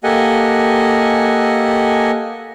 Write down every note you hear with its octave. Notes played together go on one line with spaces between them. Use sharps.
A#3 G4 A4 D#5 F#5 G#5